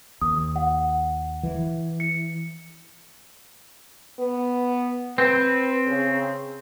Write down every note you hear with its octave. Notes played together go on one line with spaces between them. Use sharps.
D#2 D#6
F#5
E3
C#7
B3
C4 B4
C#3